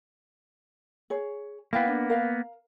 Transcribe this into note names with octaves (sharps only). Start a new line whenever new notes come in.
G#4 C#5
A#3 B3 E4 F5 G5
D4
A#4 F5